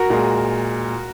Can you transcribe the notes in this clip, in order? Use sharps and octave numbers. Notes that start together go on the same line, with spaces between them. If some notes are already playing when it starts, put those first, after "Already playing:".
Already playing: F#4 A#4
A#2 G#3